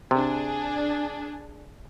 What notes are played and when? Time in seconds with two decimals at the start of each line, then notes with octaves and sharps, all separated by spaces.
0.11 C3 D4 G#4